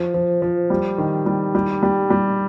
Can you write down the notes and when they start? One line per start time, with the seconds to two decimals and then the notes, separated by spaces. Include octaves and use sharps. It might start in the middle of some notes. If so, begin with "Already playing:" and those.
Already playing: F3
0.14 F3
0.42 F3
0.70 G3
0.98 D#3
1.26 G3
1.55 G3
1.83 G3
2.10 G3